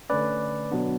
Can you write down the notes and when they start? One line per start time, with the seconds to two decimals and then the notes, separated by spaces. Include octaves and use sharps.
0.10 D3 A3 C#4 B4 D5
0.71 B2 F#3 B3 D4